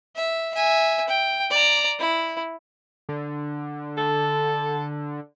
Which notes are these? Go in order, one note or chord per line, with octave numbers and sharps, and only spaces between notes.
E5
E5 G#5
G5
D5 A#5
E4
D3
A4